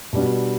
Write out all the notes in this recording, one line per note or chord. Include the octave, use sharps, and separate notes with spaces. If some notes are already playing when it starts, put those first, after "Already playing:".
B2 G3 D4